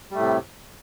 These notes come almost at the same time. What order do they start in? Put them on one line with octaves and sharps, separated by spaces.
G3 A3 A2 C3